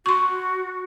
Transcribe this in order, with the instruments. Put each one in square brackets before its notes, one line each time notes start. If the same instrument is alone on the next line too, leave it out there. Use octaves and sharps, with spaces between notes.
[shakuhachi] F#4 [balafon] C6 C#6